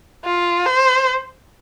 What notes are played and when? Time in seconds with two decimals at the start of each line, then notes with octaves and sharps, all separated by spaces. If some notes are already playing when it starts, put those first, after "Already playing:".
0.25 F4
0.66 C5